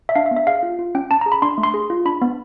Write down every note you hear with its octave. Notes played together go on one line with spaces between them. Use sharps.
E5
D4 F5
E5
B3
E5
G#4 F5
F4
F4
C#4 G5
C#4 A5
A#5
G#4
B5
D4 C6
A3
C6
G#4
F4
D4 B5
B3